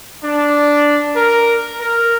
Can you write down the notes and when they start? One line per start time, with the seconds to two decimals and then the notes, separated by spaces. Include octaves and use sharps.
0.24 D4
1.16 A#4
1.80 A#4